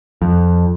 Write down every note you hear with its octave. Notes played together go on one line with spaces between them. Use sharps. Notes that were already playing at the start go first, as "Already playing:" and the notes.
F2